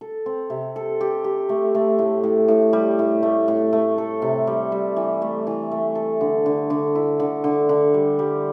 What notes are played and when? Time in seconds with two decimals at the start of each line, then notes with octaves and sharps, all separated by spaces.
0.01 A4
0.26 C4
0.50 C3
0.76 A4
1.01 G4
1.24 G4
1.49 A3
1.75 A3
1.99 A2
2.24 A2
2.48 A2
2.73 G3
2.99 A2
3.23 A3
3.48 A2
3.73 A3
3.98 A4
4.22 C3
4.47 G3
4.72 G3
4.96 E3
5.22 A3
5.47 E3
5.71 A3
5.95 A4
6.21 D3
6.46 D3
6.70 D3
6.95 E4
7.20 D3
7.44 D3
7.69 D3
7.94 G3
8.19 G3